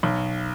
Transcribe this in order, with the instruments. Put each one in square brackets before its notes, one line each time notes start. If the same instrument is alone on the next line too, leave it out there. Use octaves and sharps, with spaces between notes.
[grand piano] B1